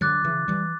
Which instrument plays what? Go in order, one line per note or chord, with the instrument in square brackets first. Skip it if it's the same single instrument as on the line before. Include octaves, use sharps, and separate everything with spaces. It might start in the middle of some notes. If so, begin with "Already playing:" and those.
[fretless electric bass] D3 F#3 [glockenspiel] D6 F#6 A6
[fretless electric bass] C#3 E3
E3 G3